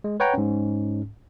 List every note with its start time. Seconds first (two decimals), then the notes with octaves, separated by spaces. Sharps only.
0.04 G#3
0.20 B4 C#5 F#5 G5 A#5
0.34 G#2 C#4